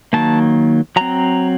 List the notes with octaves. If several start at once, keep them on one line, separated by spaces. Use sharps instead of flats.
D#3 F#3 A#3 A5
F#3 C4 A#5